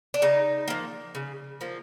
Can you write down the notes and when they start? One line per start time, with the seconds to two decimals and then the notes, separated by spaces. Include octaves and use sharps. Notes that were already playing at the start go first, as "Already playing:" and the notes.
0.14 D4
0.22 C#3 D#4
0.68 F3 A#3
1.15 C#3
1.61 F3 A#3